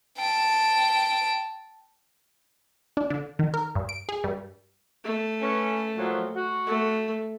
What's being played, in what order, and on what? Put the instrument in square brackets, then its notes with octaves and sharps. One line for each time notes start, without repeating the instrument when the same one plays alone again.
[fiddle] G5 A5
[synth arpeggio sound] D4
D3
D#3
A#4
G2
D7
G#4
G2
[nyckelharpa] A3
[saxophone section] C#4 B4
A#2 F3 F#3
F#4
[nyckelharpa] A3